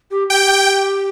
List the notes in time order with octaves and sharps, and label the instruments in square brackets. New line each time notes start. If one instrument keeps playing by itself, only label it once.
[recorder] G4
[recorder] G4 [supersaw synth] G5